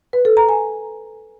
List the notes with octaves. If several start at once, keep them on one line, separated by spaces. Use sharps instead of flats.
B4
A4
A#5
G#5